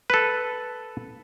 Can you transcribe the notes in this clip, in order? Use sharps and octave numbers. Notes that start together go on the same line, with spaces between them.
A4 B4